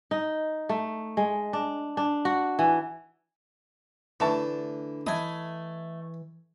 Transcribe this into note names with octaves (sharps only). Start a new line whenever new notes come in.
D#4
A3
G#3
D4
D4
F#4
E3
D3 E3 A3 D4 C#5 E5 A5
E3 A3 E4 D#5 G#5 D#6